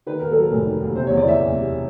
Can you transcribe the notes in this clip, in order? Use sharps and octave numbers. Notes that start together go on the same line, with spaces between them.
D#3 B4
D#2 A#4
A4
F#3
A#4
F1
D#3
D#2
C3 C5
C#5
E2
D5
E3 E5
F#1
C3